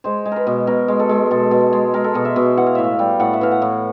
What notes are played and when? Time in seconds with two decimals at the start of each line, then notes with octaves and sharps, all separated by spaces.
0.04 G#3 C5
0.25 G#3
0.32 A#4 B4
0.47 B2
0.67 B2 A#4
0.88 G#3
0.99 A4
1.09 G#3
1.31 B2 A4
1.51 B2
1.73 G#3
1.94 G#3 A#4
2.04 A4
2.14 B2 A#4
2.25 E5
2.36 B2
2.57 E3 F#5
2.67 F5
2.75 A2 E5
2.84 F5
2.99 G3
3.20 A2 F#5
3.34 E5
3.41 E3 F5
3.52 F#5
3.62 A2